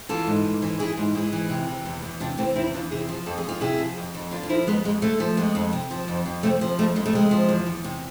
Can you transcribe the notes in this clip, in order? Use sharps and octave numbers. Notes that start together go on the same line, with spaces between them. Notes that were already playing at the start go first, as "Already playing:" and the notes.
E3 F4 A4
G#2
G#2
E3
E3 E4 G#4
G#2
G#2 E4 G#4
E3
C3
E3
E2
E2
C3 D4 F4
E3 A3 C4
E2 C4 E4
E2 D4 F4
C3 E4 G#4
F3
F2 A4
G#4
F2 F4
C3 E4 G#4
F3
F2
F2
D3 D4 F4
F4
F3 C4 E4
F2 G#3 B3
F2 G#3
D3 A3
F3
F2 G#3 B3
F2
C3
F3
F2
F2
C3 A3 C4
F3
F2 A3
F2 G#3
A3
C3 G#3
F3
E2
E2
C3